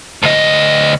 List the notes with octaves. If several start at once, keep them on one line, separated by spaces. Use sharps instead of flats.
D2 D#5